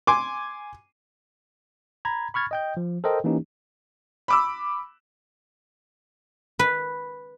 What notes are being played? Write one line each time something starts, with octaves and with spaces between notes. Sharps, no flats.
G#5 C6 D6
A#5 B5 G#6
B5 C#6 F6 G#6 A6
D#5 G5 G6
F3
A4 A#4 C5 D#5 G5
E3 A#3 C#4 D#4 G4
B5 D6 E6
B4